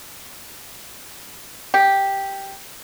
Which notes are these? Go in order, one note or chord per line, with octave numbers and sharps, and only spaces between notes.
G4